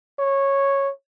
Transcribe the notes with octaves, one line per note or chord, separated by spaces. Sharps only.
C#5